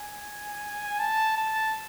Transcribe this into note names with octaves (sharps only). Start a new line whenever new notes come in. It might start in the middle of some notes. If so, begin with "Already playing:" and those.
Already playing: G#5
A5
A5